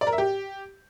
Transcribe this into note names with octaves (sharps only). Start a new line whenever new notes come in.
D5
A#4
E5
G4